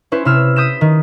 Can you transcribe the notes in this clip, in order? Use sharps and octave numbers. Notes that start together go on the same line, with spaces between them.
C#4 E4 B4 C5
C3 E4 E6 F6
D#6 G6 B6 E7
D#3